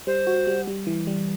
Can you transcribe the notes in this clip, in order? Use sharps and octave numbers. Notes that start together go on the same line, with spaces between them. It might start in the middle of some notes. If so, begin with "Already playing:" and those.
G3 C5
F#4
G3
G3
E3
G3